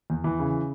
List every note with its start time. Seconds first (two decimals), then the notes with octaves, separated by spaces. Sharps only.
0.10 E2
0.24 E3
0.39 C#3